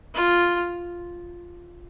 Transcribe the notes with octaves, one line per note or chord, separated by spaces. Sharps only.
F4